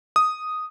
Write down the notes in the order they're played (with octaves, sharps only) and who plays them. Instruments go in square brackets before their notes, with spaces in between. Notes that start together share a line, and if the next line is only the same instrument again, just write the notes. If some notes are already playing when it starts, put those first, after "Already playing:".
[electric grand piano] D#6